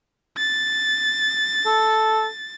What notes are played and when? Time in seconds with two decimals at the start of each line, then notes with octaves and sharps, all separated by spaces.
0.38 A6
1.66 A4